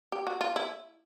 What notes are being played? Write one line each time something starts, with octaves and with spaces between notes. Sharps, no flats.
G4
F#4
F4
E4